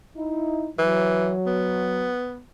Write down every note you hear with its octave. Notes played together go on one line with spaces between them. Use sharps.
D#4 E4
E3 F#3
B3